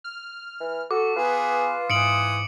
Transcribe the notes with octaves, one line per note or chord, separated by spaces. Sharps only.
F6
E3
F#4 A4 D6
B3 F4 G#4 B4
G#2 E3 D#6 C#7 D7 F#7